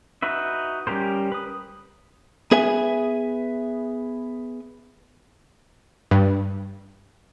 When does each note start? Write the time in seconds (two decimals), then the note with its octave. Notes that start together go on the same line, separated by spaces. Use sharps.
0.22 D#4 F#4 B4 E5
0.87 G3 C#4 G4 A#4 C5
1.32 B4 D#6
2.52 B3 G#4 B4 E5 G#5
6.11 G2